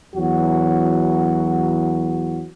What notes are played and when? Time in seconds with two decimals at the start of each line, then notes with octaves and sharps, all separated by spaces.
0.14 E2 F#3 F#4